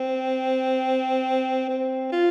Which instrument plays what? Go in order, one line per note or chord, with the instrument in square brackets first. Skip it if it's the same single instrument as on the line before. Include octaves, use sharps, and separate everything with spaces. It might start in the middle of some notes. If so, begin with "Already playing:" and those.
Already playing: [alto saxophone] C4
C4
F4